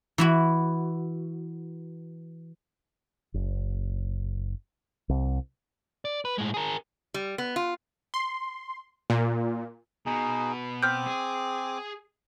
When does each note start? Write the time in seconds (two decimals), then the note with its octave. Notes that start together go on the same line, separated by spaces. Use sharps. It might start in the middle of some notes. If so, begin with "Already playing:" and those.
0.18 E3 E4 F#4
3.34 F#1
5.09 C2
6.05 D5
6.25 B4
6.38 A2 G#3
6.54 G#4 A#4
7.14 G3
7.38 B3
7.56 F4
8.14 C6
9.10 A#2
10.06 B2 D#4 G#4
10.83 C4 D6 F6 G6
11.06 G#4